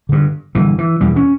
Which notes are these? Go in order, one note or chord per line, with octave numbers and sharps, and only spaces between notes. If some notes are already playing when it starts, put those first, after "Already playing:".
G2 D3
G2 D3 E3
E3
E2 B2 G3
C#4